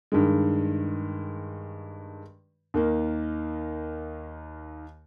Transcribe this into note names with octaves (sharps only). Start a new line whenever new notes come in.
G2 D#3 G#3
D#2 D#3 A#3